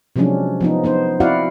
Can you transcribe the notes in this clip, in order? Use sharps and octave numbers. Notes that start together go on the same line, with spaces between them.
C3 F3 F#3 G#3 C#4 D4
F3 B3 D#4
B3 D#4 C5
C4 E4 F#4 D5 F5 F#5